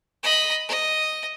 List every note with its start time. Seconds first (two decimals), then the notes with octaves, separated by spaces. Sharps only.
0.24 D#5 B5
0.69 D#5